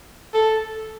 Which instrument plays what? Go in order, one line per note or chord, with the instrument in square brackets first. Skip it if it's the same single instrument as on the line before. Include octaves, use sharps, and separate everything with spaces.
[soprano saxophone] A4